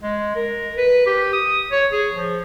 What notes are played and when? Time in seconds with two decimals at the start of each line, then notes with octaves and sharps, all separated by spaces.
0.03 G#3
0.35 A#4
0.77 B4
1.07 G4
1.33 D#6
1.72 C#5
1.92 G#4
2.12 F3